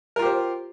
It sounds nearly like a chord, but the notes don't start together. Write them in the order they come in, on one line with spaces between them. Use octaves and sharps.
A#4 F4 G4 C5